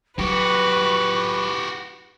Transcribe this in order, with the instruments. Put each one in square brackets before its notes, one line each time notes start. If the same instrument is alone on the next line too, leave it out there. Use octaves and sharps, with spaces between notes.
[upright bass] F#3 [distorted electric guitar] F#4 G4 [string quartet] B4 [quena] C#6